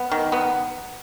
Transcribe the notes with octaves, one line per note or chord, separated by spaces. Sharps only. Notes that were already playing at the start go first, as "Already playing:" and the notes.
Already playing: B3
D#3
B3